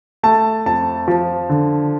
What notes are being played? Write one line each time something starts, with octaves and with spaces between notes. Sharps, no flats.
A3 A5
F2 A5
F3
D3